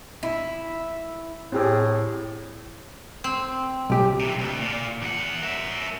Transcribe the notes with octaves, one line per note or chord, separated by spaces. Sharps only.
E4
A2 C4 G4 G#4
C4
B1 G4
C3 E3
D2
A#2
E2 F#5
A#4 E5